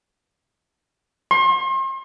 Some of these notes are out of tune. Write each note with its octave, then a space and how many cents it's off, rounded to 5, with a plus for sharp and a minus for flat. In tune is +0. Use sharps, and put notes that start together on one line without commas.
C6 +40